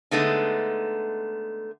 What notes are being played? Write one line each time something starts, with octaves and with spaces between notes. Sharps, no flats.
D3 G#3 A3 B3 D#4